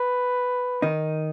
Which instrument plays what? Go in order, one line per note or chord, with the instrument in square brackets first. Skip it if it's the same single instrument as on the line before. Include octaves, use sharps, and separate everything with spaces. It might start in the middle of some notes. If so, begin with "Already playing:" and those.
Already playing: [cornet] B4
[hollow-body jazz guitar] D#3 D#4